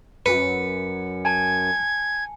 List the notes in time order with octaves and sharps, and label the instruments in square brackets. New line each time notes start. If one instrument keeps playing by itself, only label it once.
[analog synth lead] F#2 [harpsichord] B4 [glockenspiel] C#7
[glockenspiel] G#5 A5 [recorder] G#6